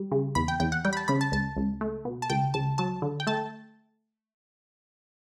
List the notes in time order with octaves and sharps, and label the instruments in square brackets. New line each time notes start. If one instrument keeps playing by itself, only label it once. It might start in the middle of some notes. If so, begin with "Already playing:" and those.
Already playing: [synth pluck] G3
C#3
E2 B5
G5
E2 G5
F#5
G3 G5
B5
A5
C#3 B5
A5
C#2 A5
C#2
A3
B2
A5
C#2 G5
C#2 A5
F#3 A5
D3
G5
A3 A5